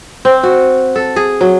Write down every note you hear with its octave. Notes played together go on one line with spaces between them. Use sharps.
C4
F#4
A4
G#4
F#3